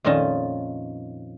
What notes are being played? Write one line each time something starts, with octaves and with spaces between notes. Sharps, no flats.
F2 A#2 D#3 C#4 D#5 A5